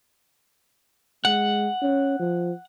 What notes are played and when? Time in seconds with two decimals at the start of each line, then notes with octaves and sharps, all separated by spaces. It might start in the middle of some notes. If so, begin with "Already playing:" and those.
1.25 G#3 F#5
1.82 C#4
2.19 F3